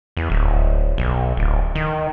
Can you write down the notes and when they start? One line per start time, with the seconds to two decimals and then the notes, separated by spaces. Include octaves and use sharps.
0.17 E2
0.30 D1
0.98 B1
1.37 D1
1.75 D#3